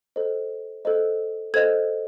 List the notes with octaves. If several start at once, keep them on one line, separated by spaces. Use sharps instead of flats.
A4 C5 D#5
A4 C5 D#5
A4 C5 D#5 G#6